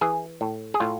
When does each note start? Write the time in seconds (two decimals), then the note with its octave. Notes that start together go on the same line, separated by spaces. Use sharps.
0.01 E3 G#4
0.41 A2
0.74 G#4
0.80 A2 F4